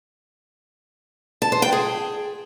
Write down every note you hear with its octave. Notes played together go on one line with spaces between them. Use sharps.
A5
C5
G5
G#4